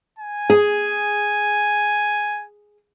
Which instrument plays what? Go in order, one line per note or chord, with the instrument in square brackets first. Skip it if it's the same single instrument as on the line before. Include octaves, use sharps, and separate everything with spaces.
[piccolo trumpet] G#5
[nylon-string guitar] G#4